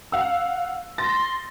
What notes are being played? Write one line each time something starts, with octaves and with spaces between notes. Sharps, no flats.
F5 F#5 E6
C6 A6 A#6